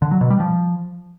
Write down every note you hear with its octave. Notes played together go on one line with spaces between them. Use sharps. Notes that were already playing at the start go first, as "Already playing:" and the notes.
D3
F#3
B2
G3
F3